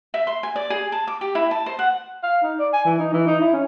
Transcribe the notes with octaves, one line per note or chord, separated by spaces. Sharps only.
E5
C6
G#5
D5
G#4
A5
D6
G4
E4
A5
C5
F#5
F5
D#4
D5
G#5
E3
D#4
E3
D#4
E4
C#4